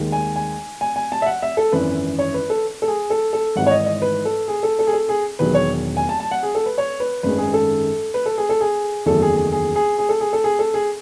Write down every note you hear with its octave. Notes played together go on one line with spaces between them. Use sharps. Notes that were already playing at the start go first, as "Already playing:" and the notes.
Already playing: D#2 D#3 G#3
G#5
G#5
G#5
G#5
A5
E5
F#5
E5
A4
G#1 F#2 E3 B4
C#5
B4
A4
A4
G#4
A4
A4
G#1 G#2 E3 F#5
C#5
D#5
D#5
B4
A4
G#4
A4
A4
G#4
A4
G#4
E1 E2 D#3 F#3 B4
C#5
G#5
A5
A5
F#5
G#4
A4
B4
C#5
B4
G#1 F#2 D#3 G#3 B4
G#4
A4
B4
A4
G#4
A4
G#4
F#1 E2 D#3 F#3 A3 A4
G#4
G#4
G#4
G#4
G#4
A4
G#4
A4
G#4
A4
G#4